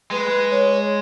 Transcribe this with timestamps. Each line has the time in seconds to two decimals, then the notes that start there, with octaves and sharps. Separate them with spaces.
0.11 G#3 B4
0.51 C#5